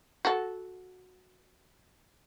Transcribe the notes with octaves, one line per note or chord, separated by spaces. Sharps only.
F#4 A4